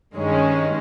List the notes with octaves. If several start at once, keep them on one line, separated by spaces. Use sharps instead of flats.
G2 D#3 G#3 C#4